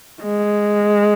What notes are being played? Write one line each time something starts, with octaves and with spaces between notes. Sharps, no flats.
G#3